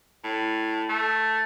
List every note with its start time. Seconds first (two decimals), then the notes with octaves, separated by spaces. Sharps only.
0.24 A2
0.89 A3